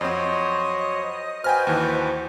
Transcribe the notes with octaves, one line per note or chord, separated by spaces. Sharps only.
F2 F#3 C4 C5 C#5 D#5
F#4 B4 C5 G5 G#5 F6
D#2 E3